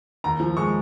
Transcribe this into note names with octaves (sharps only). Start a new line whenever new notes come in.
D#2 A#5
F3
G#3 C#6